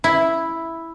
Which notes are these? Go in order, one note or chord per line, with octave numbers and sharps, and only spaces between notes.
E4